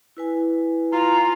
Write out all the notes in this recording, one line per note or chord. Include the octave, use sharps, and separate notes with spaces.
E4 B4 G#5
F4 A#5